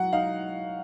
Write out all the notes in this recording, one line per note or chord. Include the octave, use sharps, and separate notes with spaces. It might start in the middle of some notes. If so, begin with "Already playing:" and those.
Already playing: F#3 F#5
D#4 F5